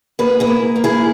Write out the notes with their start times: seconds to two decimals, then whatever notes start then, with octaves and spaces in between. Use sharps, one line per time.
0.19 A#3 G#4 B4
0.40 E4 G#4
0.47 A#3
0.76 A#3
0.84 E4 G#4